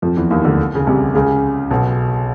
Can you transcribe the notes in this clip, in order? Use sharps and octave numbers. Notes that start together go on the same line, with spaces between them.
F2 F3
E2 E3
D#2 D#3
D2 D3
C#3
C2 C3
C#2 C#3
B1 B2